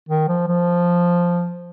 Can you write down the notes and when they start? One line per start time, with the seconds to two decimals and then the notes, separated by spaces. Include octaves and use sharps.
0.09 D#3
0.28 F3
0.47 F3